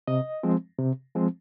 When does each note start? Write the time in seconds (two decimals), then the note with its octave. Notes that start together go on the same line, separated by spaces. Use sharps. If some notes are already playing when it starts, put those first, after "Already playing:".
0.07 C3 D#5
0.43 F3 G#3 C4
0.79 C3
1.15 F3 G#3 C4